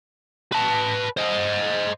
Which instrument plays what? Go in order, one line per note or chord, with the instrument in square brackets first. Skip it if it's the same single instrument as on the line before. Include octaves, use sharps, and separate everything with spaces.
[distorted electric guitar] B4 A5
C5 D#5